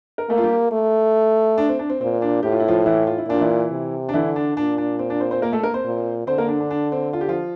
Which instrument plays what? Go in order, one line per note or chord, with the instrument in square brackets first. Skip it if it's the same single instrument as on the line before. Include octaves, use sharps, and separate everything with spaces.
[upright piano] A#4
[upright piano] A3 A4 [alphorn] A#3
[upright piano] F4
G3 G4
[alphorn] A3
[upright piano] D4
C4
D4
C4
[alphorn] A#2 [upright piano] C4
[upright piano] D4
[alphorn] A2 [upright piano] G4
[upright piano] F4
E4
F3 F4
E3 E4
F4
E4
[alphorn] A#2 [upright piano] D4
[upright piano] E3 E4
[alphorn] C3
[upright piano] D4
[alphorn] D3 [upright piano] E3 E4
[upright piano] D4
[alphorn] A#2 [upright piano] D4
[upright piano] D4
C4
D4
C4 C5
C4 C5
A#3 A#4
A3 A4
A#3 A#4
C4 C5
[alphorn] A#2
[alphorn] D3 [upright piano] C4 C5
[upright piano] A#3 A#4
D4
D4
D4
C4
F4
G4
F3 F4